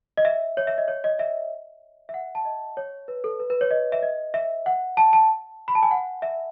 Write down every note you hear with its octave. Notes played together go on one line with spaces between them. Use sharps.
D#5
E5
C#5
E5
D#5
C#5
D#5
E5
E5
F#5
A5
D#5
C#5
B4
A4
B4
B4
C#5
D#5
E5
D#5
E5
F#5
A5
A5
B5
A5
G#5
F#5
E5